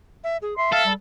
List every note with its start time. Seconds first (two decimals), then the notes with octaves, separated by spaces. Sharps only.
0.24 E5
0.42 G#4
0.58 E5 C6
0.73 A4 F5
0.85 G3